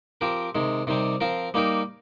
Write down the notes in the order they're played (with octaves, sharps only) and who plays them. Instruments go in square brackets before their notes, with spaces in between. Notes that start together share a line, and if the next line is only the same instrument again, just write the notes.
[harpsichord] F3 C4 G4 A#4
C3 D#3 G#3
C3 D#3 G3 C4
F3 C4 F4 A#4
G3 A#3 D#4 G4 A#4